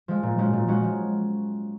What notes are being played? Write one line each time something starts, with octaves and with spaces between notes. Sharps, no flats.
F3 G#3
A#2
F3 G#3 C#4 F#4
A#2
F3 G#3 C#4 F#4
F3